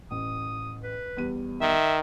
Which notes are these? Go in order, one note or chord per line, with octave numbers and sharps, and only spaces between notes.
A1 D#6
B4
E2 G3 D#7
D#3 E5